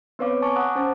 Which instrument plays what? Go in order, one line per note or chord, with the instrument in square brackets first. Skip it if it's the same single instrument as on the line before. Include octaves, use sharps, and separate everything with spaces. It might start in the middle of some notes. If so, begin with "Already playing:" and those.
[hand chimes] B3 C4 B4 C#5 F5 D6
G#5 A5 C#6 D6
F5 F#5 A#5 D6 D#6 F#6
C#4 C5 A5 D6